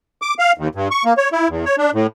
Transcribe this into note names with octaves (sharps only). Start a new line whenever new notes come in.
D6
F5
D#2
G2
C#6
A#3
C#5
E4
E2
C#5
D4
A2